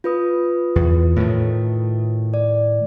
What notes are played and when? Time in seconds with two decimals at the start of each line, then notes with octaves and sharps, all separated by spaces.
0.04 F4 B4 D#6
0.76 E2
1.16 A2 D#3 A3
2.34 D5